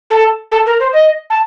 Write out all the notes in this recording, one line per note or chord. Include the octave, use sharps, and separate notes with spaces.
A4
A4
A#4
C5
D#5
A5